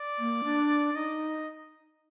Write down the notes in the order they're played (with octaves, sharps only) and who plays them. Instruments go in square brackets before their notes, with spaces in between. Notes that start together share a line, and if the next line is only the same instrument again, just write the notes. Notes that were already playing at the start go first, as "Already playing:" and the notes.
Already playing: [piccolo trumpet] D5
[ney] A#3
D4
[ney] D#4 [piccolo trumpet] D#5